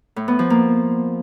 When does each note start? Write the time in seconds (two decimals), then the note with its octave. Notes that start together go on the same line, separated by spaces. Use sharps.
0.16 A2
0.28 B3
0.39 F3
0.50 A#3